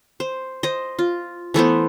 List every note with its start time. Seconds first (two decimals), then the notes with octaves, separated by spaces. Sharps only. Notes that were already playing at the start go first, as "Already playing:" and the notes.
0.20 C5
0.63 C5 D#5
0.99 F4
1.54 E3 A3 B3 C5